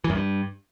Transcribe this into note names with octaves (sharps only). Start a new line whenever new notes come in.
E3
F#2
G2